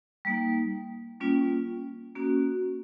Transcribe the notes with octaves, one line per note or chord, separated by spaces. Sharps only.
G3 A#3 D#4
G3 A#3 C#4 F4
A#3 C#4 F#4